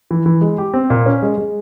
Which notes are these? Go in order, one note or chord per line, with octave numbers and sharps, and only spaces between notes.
E3
E3
G#3
G4
C4
A#2
C#4
G#3
G#3